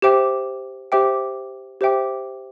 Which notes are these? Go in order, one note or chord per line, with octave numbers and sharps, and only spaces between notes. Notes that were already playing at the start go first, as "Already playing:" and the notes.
G4 C5 E5 G5 D6
G4 C5 E5 G5 D6
G4 C5 E5 G5 D6